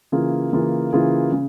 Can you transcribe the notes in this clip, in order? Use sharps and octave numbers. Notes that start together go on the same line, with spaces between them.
C#3 E3 A#3 F4 G#4
C#3 E3 A#3 F4 G#4
C#3 E3 A#3 F4 G#4
C#3